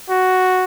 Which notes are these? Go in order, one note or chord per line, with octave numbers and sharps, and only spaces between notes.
F#4